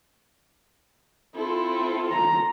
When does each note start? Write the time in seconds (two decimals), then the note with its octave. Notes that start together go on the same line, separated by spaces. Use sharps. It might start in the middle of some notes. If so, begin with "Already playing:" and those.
1.35 C4 E4 F4 A4
2.12 A#5